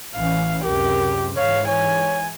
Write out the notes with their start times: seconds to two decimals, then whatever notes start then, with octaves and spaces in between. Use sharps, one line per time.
0.15 A1 E3 C#4 F5
0.64 C#2 F#2 C3 G4 A#4
1.37 G#2 E3 C#5 F5
1.68 C#5 G#5